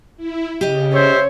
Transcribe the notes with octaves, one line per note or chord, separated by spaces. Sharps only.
E4
C#3 G4 D#5
C5 C#5 E5